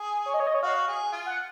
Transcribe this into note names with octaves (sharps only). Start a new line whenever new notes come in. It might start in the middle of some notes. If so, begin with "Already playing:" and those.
Already playing: G#4
C#5
D#5
C#5
D#5
C#5
F#4 F5
G#4
F4
F#5